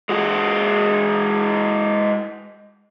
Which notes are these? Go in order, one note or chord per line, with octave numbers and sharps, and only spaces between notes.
G#3 F#4